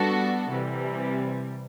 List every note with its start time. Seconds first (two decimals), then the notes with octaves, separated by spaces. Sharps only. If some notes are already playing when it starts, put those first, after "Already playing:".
Already playing: G3 B3 D4 F#4 A4
0.50 C3 E3 G3